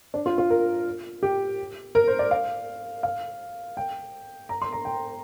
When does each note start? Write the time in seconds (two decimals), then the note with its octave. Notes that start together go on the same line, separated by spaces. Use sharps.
0.14 D4
0.26 F4
0.38 F4
0.50 A#4
1.23 G4
1.95 A#4
2.08 C5
2.19 D5
2.31 F5
3.03 F5
3.77 G5
4.49 A#5
4.62 C6
4.72 A#5
4.85 G5